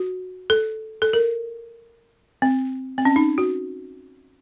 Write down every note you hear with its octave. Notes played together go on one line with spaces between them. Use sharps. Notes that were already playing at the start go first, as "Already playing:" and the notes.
Already playing: F#4
A4
A4
A#4
C4
C4
C#4
D#4
F#4